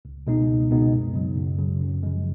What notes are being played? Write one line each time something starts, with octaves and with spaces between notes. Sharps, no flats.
C#2
B2 G#3 B3 D#4
C#2
B2 G#3 B3 D#4
F#2
C#3 F#3
F#2
C#3 F#3
F#2
C#3 F3 G#3